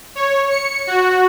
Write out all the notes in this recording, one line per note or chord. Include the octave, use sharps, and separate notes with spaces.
C#5
C#7
F#4